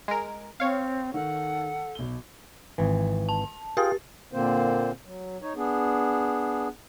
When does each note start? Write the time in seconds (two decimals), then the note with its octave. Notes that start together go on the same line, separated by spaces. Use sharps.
0.08 G#3 A#4
0.60 C4 C#5 F5
1.14 D#3 A4 F#5
1.95 B1 G7
2.78 G#1 E3
3.29 A5
3.77 F4 G4 G#4 G5 A6
4.33 A#2 D3 A#3 C4 C5
5.05 F#3
5.42 D#4 C#5
5.56 B3 D4 G#4